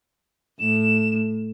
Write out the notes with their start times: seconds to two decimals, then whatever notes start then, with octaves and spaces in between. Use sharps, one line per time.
0.60 A2 E7